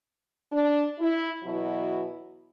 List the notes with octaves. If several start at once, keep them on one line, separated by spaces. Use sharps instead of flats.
D4
E4
E2 B2 F#3 E4